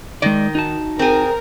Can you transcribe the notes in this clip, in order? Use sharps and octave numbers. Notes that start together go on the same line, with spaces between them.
D#3 G#3 D5
D#4 F#4 A5
C4 G#4 A#4